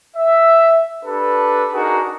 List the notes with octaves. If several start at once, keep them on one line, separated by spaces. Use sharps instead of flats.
E5
D4 G4 A4 B4
D4 D#4 F#4 G#4 A#4